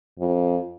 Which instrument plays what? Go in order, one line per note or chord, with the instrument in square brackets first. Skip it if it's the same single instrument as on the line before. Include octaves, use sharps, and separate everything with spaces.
[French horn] F2